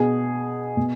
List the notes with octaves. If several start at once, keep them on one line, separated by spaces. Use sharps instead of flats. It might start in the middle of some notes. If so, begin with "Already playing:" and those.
Already playing: B2 G#4
B2